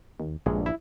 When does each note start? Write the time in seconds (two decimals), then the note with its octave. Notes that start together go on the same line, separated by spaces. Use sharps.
0.20 D#2
0.46 A#1 G2 G#3
0.66 E4